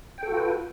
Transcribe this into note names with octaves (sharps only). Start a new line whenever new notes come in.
F4 F#4 A4 B4 G5